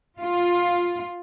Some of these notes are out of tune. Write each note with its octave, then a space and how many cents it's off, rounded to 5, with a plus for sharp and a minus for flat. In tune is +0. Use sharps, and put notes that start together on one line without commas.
F4 +10